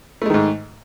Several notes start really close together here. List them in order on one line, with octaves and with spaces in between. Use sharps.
A3 G#3 D#3 G#2